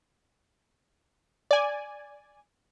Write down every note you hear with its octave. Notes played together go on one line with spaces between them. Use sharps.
D5 G#5